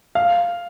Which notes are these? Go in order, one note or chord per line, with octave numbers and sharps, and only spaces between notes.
F5